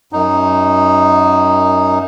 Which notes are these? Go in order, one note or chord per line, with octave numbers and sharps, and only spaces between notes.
F#2 D#4